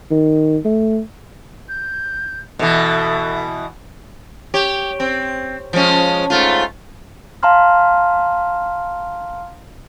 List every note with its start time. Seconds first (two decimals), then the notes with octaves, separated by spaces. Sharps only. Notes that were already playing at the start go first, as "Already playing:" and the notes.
0.11 D#3
0.65 A3
1.69 G6
2.59 B2 E3 A4 E5
4.54 G4 C#5
5.00 C4
5.73 F3 G#3 C#4
6.30 G#2 A3 F4
7.43 F5 A5 A#5 C6 F6